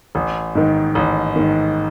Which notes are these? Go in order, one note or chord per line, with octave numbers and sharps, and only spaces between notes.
A1
G#2 D#3
A1
G#2 D#3